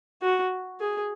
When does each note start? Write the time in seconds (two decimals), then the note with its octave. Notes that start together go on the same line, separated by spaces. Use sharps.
0.22 F#4
0.80 G#4